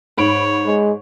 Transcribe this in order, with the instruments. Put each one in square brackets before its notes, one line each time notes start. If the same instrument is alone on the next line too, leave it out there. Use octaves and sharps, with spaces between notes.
[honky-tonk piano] G#2 B5 D7 [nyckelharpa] C#5
[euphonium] G#3